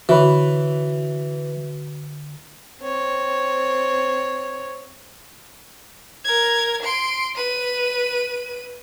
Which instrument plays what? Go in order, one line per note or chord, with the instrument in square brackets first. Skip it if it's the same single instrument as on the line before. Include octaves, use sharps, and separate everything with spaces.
[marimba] D3 C#5 B5 [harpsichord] E3 [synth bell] F#4 B4
[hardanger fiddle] C4 C#5
[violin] A#4 G#6
C6 D7
B4 D#7